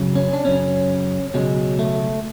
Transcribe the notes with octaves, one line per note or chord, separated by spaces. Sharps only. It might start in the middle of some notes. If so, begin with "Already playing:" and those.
Already playing: F#2 C#3 F#3
C#4
D4
F#2 C#3 F#3 C#4
C#2 B2 F#3 G#3
A3